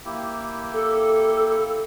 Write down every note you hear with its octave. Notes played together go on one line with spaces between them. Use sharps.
A#3 E4 G4
A4